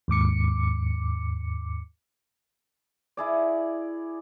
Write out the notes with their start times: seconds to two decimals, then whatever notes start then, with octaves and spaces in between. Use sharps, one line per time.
0.08 D#2 G#2 D6 C#7
3.17 E4 G#4 D5